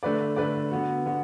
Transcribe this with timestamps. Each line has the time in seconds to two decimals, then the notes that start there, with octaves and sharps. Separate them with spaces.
0.03 D3 A3 D4 B4 D5
0.36 D3 A3 D4 B4 D5
0.71 D3 B3 F#4
1.06 D3 B3 F#4